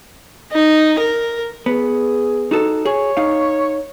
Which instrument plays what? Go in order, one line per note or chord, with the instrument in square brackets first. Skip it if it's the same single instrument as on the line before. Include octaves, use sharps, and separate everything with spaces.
[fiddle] D#4
A#4
[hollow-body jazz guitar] B3 [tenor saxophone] G#4
[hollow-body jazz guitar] D#4 F#4 A4
[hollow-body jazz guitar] G#4 [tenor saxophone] C#5
[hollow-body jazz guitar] D#4 F5